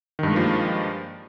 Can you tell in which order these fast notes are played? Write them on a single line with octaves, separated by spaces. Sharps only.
D#3 G2 G#3 A#3 F3